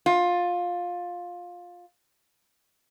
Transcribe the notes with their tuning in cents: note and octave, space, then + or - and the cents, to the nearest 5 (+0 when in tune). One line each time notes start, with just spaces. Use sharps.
F4 +15